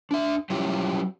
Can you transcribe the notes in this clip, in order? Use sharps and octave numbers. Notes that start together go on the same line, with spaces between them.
D4 E5
F#3 G3 C#4 E4 F4 G4